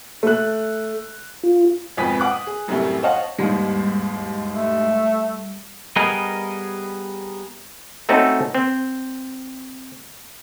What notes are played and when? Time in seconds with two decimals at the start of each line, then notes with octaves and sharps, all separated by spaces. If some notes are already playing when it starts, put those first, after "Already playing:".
0.23 A3 F#6
1.44 F4
1.97 G#1 F2 B2 B4 G#5 B6
2.20 F#5 D6 F#6
2.31 D#6
2.47 G#4
2.68 A1 F#2 A2 C3 G3 A3
3.03 C5 C#5 D#5 F5 F#5 A5
3.39 E1 D#2 G#2 G3
4.54 A3
5.96 G3 B3 G#4 A#4 D#5
8.09 A3 C4 C#4 D#4 F#4 A4
8.55 C4